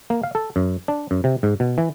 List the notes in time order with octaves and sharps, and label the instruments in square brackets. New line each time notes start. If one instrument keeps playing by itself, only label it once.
[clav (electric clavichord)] A#3
F5
A4
F#2
D4
F#2
C3
G#2
B2
E3